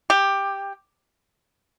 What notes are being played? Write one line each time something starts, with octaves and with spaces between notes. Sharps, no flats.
G4